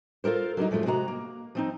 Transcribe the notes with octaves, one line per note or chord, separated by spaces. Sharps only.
F4 A4 A#4 C5
F#3 G3 D4 D#4
F#2 F3 G#3 A3 F4
C3 G#3 F#4 G#5 A#5
A#3
F3 C4 D#4